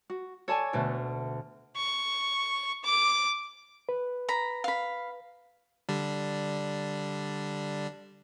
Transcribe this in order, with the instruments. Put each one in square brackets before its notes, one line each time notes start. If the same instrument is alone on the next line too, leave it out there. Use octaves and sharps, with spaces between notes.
[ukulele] F#4
[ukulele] A4 D5 A5 [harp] C#5 G#5
[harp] D2 B2 A3
[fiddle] C#6
D6
[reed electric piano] B4
[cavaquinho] A#5 B5
F5 B5
[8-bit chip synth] D3 G3 D4